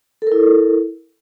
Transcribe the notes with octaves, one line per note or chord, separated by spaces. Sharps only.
E4 A4 A#4